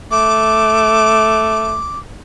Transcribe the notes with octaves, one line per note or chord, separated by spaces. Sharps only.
A3 D6